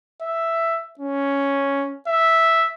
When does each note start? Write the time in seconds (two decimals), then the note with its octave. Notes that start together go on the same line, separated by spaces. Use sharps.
0.22 E5
0.99 C#4
2.07 E5